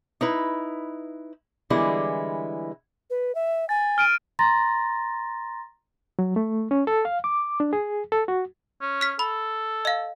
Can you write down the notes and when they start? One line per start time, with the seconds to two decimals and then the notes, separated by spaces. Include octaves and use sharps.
0.21 D#4 E4 B4
1.70 D3 E3 G3 G#3 B3 E4
3.10 B4
3.35 E5
3.69 G#5 A6
3.98 F6 D7 D#7
4.39 A#5 C6 A6 A#6
6.19 F#3
6.36 A3
6.71 C#4
6.87 A4
7.05 F5
7.24 D6
7.60 D4
7.73 G#4
8.12 A4
8.28 F#4
8.81 C#4
9.01 F6 B6
9.19 A4 B5
9.85 D#5 F5